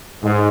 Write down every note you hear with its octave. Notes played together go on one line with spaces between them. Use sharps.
G#2